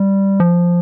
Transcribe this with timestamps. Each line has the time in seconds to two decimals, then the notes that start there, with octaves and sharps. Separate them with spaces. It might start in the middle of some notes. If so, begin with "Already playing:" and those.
Already playing: G3
0.40 F3